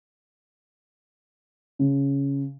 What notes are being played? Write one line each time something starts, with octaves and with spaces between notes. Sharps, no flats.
C#3